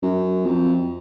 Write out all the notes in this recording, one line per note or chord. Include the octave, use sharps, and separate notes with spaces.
F#2
F2